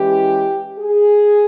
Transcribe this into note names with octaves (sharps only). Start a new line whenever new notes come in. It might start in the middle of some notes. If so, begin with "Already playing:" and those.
Already playing: E3 G#3 C#4 E4 G4
G#4